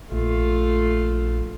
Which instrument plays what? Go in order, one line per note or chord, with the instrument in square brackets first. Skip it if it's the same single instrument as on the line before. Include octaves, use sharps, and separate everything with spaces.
[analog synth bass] A#1 [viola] A3 F4